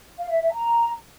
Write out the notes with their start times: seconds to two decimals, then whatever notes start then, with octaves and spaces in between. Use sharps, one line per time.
0.19 F5
0.30 E5
0.42 E5
0.53 A#5